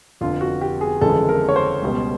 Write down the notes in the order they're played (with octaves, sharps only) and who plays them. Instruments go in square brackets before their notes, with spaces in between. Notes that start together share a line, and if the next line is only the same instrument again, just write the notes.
[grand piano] F1 F2 D3 F4
F#4
G4
G#4
G1 F2 C#3 E3 G#3 A4
A#4
C#5
C5
C#2 B2 G3